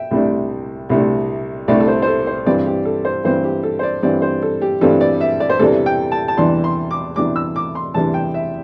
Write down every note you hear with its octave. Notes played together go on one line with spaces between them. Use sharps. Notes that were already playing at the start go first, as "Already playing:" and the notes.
Already playing: E5 G5
C2 C3 A3 D4
C2 C3 A3 D4
C2 C3 A3 D4 D5
A4
C5
C5
A4
C5
G2 E3 G3 C4 D5
G4
A4
C5
G2 E3 G3 C4 C5
G4
A4
C5
D5
G2 E3 G3 C4 D5
C5
A4
G4
G2 E3 G3 C4 A4
D5
E5
D5
C5
E2 C3 E3 G3 D4 A4
G5
A5
A5
E2 C3 E3 G3 D4 C6
C6
D6
E2 C3 E3 G3 D4 D6
E6
D6
C6
E2 C3 E3 G3 D4 A5
G5
E5